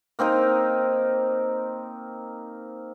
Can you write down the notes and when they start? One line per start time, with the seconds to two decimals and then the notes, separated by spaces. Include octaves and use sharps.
0.19 A#3 C4 D#4 A#4